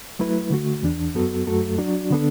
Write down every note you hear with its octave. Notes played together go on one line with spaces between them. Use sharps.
F#3 A3 E4 B4
D3 A3 F#4
E2 E3 D4
F#2 F#3 B3 F#4 A4
F#2 F#3 A3 F#4 A4
F#3 D4 F#4 D5
D3 B3 D4 A4